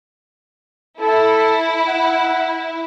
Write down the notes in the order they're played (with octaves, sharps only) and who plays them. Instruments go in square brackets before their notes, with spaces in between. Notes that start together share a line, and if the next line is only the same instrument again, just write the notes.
[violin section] E4 [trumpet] A4
[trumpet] F#5